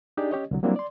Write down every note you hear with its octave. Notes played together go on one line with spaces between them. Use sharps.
D4 D#4 G4 G#4 D5
C#4 G4 C#5 D#5
C2 D3 F#3
F#3 G3 A#3 C4 D4 E4
D5 C6